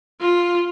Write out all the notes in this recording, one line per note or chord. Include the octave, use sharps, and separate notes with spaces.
F4